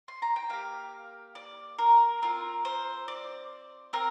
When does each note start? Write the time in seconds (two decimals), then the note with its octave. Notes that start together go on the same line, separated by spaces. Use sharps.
0.08 C6
0.22 A#5
0.36 G5
0.50 A#3 G4 F5
1.35 D5
1.79 A#4
2.22 C4 F4 A#4
2.65 C5
3.08 D5
3.93 C4 A#4